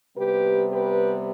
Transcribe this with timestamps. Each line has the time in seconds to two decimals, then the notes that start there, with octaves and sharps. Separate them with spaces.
0.16 C3 G3 B3 G4 B4
0.71 G4 B4